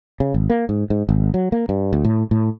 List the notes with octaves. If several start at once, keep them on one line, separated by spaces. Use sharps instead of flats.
C#3
G#1
A#3
G#2
G#2
G#1
F#3
A#3
G2
D2
A2
A2